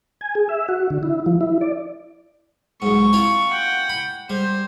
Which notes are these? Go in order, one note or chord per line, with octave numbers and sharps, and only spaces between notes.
G#5
G#4
E5
F#4
D3
E4
F3
E4
D5
B1 G#2 C#6
C4 E4 F4
F#5 G5
B5
G3 C5